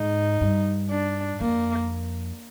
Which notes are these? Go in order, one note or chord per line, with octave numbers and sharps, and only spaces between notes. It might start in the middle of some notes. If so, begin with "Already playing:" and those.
Already playing: G#2 D#4
G2
D4
F2 A#3